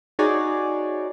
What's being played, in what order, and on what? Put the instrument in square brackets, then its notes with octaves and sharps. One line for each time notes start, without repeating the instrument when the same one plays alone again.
[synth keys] D#4 F#4 G#4 C#5 D5